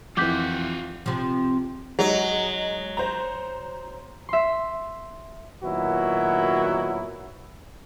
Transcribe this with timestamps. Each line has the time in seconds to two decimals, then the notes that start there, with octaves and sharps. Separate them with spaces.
0.17 F2 E3 F4 F#5 D6 G6 B6
1.06 C3 F3
1.99 F#3 G#3 D#4
2.97 C5 A#5
4.29 E5 C6
5.63 A#2 D#3 F#3 B3 E4 F#4